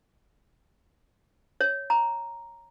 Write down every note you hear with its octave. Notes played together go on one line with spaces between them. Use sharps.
C#5
A#5